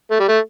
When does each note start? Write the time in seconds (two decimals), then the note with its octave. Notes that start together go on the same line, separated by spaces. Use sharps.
0.11 A3
0.20 G3
0.29 A3